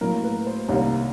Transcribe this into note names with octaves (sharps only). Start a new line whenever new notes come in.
A2 F#3 A#3 A#4
B4
C5
C2 C3 D#3 G3 A#3 C#5